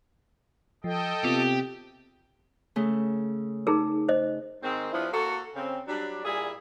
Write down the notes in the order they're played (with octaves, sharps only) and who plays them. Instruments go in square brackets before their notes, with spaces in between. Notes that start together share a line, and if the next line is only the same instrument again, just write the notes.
[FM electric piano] F3 [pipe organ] A4 D#5 G5
[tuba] C3 [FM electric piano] B3 C4 F4 [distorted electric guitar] G4
[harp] C#3 A3
[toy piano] D#4 G#4 A#4
C5 D#5
[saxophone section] G#2 D#3 G#3 C4
G2 F3 B3 D4 E4
A#3 F#4 A4
C#3 C4
F#3 G3 D4
A#2 G3 E4 G#4